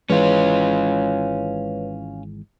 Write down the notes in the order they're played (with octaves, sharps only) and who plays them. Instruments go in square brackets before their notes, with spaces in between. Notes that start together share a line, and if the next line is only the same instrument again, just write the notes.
[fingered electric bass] G#1 E3 G#3 [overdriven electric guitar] C#4 F4 [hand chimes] B4 C#5